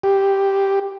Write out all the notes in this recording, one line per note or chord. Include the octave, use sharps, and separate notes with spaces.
G4